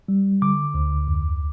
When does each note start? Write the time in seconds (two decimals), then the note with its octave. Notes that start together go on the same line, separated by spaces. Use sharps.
0.08 G3
0.42 D3 D6
0.74 D2
1.08 F2